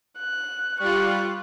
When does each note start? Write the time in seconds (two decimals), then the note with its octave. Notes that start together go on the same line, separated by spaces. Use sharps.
0.19 F#6
0.80 G3 F4 C#6 F#6